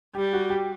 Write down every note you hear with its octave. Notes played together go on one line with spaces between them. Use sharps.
G3 G4
F#4
G4